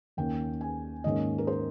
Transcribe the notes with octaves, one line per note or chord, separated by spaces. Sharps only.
D#2 D#3 A#3 C#4 G5
G#5
G#2 D#3 A#3 C#4 D#5
A#4
C5